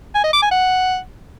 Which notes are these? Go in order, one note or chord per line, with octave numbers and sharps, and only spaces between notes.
G#5
D#5
D6
G#5
F#5